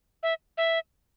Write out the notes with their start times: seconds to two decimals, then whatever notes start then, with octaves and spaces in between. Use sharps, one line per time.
0.23 E5
0.58 E5